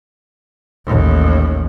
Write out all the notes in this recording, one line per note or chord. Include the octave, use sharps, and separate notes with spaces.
A1 D#2